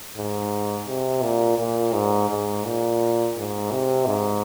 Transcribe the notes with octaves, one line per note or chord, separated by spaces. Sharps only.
G#2
C3
A#2
A#2
G#2
G#2
A#2
G#2
C3
G#2